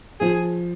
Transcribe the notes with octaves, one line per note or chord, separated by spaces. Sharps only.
F3 G#4